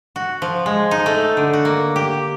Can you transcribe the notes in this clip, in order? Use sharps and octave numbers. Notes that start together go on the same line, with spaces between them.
F#4
F3
G#3
D#4
A3
D3
F#4
A#3
G4